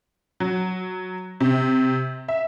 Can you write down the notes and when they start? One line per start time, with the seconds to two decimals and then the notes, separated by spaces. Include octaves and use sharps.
0.40 F#3
1.40 C3
2.28 E5